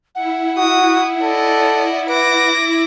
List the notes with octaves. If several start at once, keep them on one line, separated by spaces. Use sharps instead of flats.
E4 F#5
E4 F#4 D#6
A4 D5 D#5
B4 D6 A#6